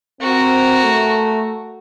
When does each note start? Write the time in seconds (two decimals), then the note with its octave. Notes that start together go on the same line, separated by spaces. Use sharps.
0.21 C4 F#4 A#4
0.83 A3